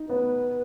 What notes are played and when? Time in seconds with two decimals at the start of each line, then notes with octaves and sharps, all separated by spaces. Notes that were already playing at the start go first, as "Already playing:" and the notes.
Already playing: D#4
0.09 B3 B4